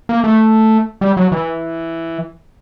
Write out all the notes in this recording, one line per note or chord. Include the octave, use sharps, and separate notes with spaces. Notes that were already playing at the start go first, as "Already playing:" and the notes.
A#3
A3
G3
F#3
E3